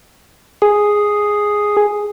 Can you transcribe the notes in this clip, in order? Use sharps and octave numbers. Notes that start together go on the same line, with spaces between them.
G#4